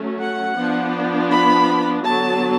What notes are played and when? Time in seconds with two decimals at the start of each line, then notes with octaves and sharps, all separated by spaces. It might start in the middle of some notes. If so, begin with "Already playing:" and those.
Already playing: F#3 A3 C#4
0.19 F#5
0.56 F3 B3 D4
1.30 B5
2.04 D3 F#3 B3 A5